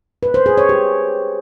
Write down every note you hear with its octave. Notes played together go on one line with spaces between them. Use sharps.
B4
C5
G#4
C#5
G4